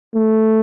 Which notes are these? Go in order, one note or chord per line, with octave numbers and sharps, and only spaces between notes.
A3